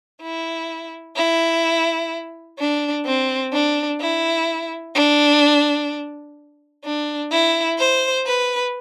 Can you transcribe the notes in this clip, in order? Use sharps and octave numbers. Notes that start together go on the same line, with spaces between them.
E4
E4
D4
C4
D4
E4
D4
D4
E4
C5
B4